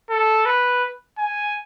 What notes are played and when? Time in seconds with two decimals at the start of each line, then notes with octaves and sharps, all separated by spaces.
0.10 A4
0.46 B4
1.19 G#5